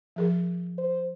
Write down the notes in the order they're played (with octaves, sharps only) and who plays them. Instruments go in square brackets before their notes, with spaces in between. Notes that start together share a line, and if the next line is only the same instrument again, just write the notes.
[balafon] F3 G#4 A#4
[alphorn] C5